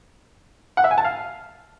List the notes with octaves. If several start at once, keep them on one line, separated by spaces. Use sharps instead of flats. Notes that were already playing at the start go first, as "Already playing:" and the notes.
F#5
E5
G#5
A5
F5